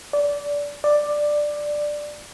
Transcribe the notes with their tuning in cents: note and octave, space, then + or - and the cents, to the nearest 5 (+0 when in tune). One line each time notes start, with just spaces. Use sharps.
D5 -20
D5 +10